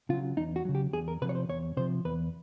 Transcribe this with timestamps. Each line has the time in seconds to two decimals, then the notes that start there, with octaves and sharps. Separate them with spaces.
0.09 C#3 F#3 F4
0.37 E2 D#4
0.56 F#4
0.65 C#3 F#3
0.75 G4
0.93 E2 G#4
1.08 A#4
1.22 C3 F3 B4
1.29 C#5
1.35 C5
1.49 E2 C#5
1.77 C3 F3 C5
2.05 E2 B4